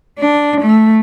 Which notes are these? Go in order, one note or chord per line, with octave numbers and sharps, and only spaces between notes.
D4
A3